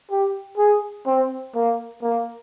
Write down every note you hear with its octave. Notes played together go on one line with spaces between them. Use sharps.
G4
G#4
C4
A#3
A#3